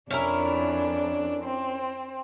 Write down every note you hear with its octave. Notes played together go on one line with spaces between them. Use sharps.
F2 C#4 D4 E4 A#4
C4